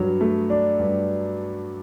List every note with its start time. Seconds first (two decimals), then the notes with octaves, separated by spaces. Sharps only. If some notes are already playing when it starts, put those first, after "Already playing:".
Already playing: G2 F#3
0.21 A3
0.50 D4
0.79 G2